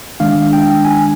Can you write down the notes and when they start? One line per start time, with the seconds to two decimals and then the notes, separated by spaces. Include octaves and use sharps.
0.20 D#3 G#3 D4 F5
0.53 G5
0.85 G#5